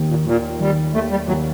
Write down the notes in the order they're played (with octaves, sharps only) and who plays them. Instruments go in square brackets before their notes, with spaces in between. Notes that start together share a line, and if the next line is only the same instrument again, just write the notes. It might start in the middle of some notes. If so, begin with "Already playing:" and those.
Already playing: [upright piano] D#2 D#3
[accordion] A#2
[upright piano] D#2 [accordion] A#2
[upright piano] D#3 [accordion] G3
[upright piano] D#2 [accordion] A3
[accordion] G3
[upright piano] D#2 [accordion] F#3